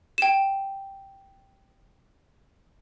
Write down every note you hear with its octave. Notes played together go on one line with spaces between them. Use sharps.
G5 E7